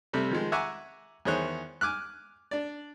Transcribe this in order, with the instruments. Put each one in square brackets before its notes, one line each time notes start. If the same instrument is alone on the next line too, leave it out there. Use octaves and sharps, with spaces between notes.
[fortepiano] C3 G3 A3
D#3 F3 G#3
E5 F#5 G#5 A#5 C#6 D6
E2 D#3 G#4 C5 C#5 F#6
G#5 D6 F6 F#6
D4 D5